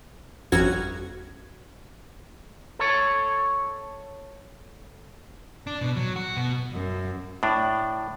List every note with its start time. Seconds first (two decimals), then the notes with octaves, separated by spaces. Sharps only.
0.52 G1 F2 C#4 F#4 G#6
2.79 A4 C#5
5.67 D4
5.81 B2
5.96 F#3
6.16 F#4
6.37 B2
6.71 F#2
7.43 A2 D4